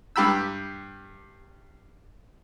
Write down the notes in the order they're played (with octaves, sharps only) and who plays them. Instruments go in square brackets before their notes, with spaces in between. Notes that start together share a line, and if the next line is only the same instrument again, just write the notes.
[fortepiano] G2 G4 B5 E6